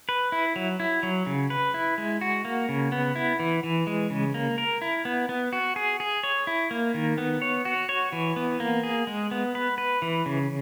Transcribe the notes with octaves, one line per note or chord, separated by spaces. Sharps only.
B4
E4
F#3
E4
F#3
C#3
B4
E4
G#3
F#4
A#3
C#3
B3
E4
E3
E3
G#3
C#3
A#3
A#4
E4
B3
B3
F#4
G#4
G#4
C#5
E4
A#3
D#3
B3
C#5
F#4
C#5
E3
B3
A#3
G#4
G#3
B3
B4
B4
E3
C#3